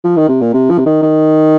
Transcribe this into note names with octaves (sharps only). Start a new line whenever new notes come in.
F3
D#3
C3
A#2
C3
F3
C3
D#3
D#3